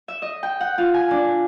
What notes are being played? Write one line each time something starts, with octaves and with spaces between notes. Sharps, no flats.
E5
D#5
G5
F#5
F4
G#5
D4